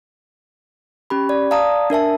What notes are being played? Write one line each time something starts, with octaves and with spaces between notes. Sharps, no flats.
C#4 G4 B5
D5
D5 F5 A5 A#5 D#6
D4 A#4 E5 A5